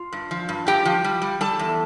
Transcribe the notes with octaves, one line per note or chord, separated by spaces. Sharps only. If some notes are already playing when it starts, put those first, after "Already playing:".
Already playing: F4
G2
F3
G2
G2 G4 G5
F3
G3
G3
G3 A4 A5
E2